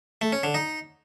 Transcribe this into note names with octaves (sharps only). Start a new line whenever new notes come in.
A3
C#4
D3
D#4